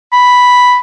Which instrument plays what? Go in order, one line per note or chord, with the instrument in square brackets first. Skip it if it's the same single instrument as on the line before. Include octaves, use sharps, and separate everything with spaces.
[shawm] B5